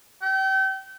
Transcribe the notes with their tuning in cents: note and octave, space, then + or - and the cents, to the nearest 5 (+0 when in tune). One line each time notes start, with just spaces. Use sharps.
G5 -35